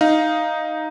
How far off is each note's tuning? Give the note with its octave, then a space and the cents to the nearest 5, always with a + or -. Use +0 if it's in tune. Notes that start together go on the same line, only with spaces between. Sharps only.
D#4 +0 F5 +0